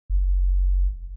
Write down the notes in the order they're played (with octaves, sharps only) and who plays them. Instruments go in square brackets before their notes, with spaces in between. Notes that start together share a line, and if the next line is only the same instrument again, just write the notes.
[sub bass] F#1